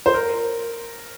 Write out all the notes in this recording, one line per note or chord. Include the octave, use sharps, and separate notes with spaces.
C5
A#4